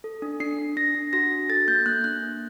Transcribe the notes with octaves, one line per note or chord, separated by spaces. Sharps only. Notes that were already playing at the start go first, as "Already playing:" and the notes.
A4
D4
D4 C7
D4
D4 A#6
D4
F#4 A#6
D4
A4 A6
A#3 G6
A#3 F#6
D4 F#6
A#3